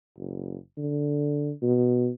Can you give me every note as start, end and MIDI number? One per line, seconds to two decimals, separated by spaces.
0.18 0.56 30
0.77 1.51 50
1.62 2.09 47